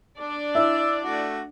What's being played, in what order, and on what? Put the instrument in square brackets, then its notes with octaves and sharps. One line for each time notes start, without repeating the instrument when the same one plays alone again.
[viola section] D4 D5
[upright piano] E4 [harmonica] E6
[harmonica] A3 F#4